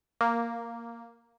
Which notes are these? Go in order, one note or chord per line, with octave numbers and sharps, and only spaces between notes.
A#3